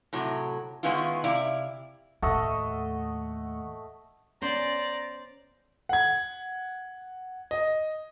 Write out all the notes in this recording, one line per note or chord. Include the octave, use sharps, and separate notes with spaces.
A2 C3 F#3
D#3 G#3 B3 C#4 E4 F4
C3 E4 D5 F5
D#2 A2 A3 D#5 F#5
B3 C#4 C5 D5 A#5
F#5 G#6
D#5